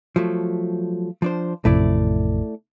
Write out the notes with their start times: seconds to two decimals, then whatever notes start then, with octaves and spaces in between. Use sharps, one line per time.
0.16 F3 F#3 A3
1.22 F3 D4 C5
1.65 A1 F2 C3 A3 E4 D5